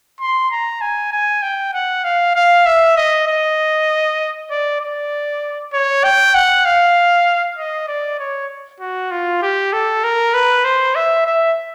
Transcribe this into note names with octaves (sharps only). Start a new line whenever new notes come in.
C6
A#5
G#5
G#5
G5
F#5
F5
F5
E5
D#5
D#5
D5
D5
C#5
G5
F#5
F5
D#5
D5
C#5
F#4
F4
G4
A4
A#4
B4
C5
E5
E5